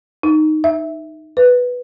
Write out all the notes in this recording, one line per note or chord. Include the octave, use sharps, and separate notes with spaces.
D#4
E5
B4